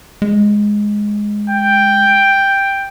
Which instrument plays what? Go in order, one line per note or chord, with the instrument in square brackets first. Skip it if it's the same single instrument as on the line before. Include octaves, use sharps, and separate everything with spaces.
[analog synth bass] G#3
[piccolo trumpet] G5